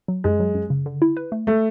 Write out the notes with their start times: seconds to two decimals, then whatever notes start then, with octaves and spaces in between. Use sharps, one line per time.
0.08 F#3
0.24 F#2 G#3
0.40 F#3
0.55 F#2
0.70 C#3
0.86 D3
1.02 E4
1.17 B4
1.32 A3
1.47 A3